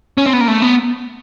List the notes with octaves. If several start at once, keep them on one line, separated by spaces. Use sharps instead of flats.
C#4
C4
B3
A#3
A3
B3